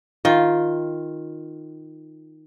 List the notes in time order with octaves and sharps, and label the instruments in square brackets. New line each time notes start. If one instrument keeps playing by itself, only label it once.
[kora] D#3 F4